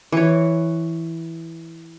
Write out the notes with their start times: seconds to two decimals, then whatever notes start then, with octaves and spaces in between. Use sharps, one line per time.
0.12 E3 C#5